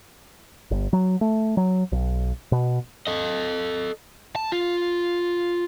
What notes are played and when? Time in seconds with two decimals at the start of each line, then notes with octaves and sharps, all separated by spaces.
0.71 G1
0.93 F#3
1.21 A3
1.57 F#3
1.92 B1
2.52 B2
3.07 A4 D#5
4.36 A5
4.52 F4